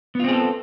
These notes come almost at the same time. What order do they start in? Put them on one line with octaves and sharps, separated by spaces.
B3 F4 C4 G#4 A4